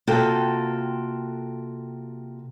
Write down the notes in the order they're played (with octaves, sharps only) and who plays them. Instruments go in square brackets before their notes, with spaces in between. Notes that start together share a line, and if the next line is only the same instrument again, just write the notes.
[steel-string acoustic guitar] C3 A#3 F4 F#4 A4 G5